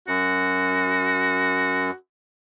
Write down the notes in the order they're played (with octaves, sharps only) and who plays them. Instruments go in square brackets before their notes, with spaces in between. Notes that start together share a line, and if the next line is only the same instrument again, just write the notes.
[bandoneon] F#2 [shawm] F#4